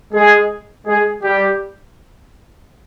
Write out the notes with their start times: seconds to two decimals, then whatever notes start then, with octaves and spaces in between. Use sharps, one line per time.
0.13 G#3 G#4
0.86 G#3 G#4
1.23 G3 G4